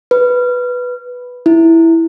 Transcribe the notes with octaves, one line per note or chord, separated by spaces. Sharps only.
B4
E4